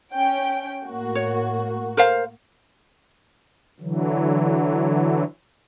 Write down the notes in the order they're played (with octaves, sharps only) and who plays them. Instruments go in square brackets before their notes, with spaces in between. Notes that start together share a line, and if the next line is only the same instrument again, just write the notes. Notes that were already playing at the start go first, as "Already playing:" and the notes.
[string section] C#4 G5
A2 A#3 F#4
[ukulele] C#5
A#4 C5 F5
[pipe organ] D3 E3 F#3